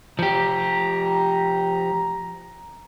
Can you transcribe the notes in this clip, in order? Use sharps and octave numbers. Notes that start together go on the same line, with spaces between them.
F3 G4 A#5